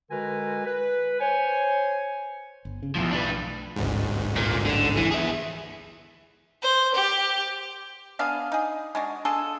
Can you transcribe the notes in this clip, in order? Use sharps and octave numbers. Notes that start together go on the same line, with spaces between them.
D3 G#3 F#4 A#4 B4 G#5
B4
C5 C#5 G#5
G1
C#3
B1 E2 A2 F3
D4 B4
A1 D2 G#2
A#2
D3
E3
G#4 E5
C5
G4
B3 D4 G#4 F5
D#4 G#4
G#3 D4 F#4
D4 F4 G#4 A4